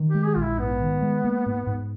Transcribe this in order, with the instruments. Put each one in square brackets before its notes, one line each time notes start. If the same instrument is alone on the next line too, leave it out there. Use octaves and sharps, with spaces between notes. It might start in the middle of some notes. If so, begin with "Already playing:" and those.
Already playing: [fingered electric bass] D#3
[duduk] G4
[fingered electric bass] G#3
[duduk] G#4
[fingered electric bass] A#1 [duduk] F4
[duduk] E4
[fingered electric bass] G#2 [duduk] B3
[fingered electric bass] D#3
G#3
A#3
G#2
G#2